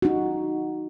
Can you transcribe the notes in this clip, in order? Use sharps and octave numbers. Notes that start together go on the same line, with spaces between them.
D#4 F#4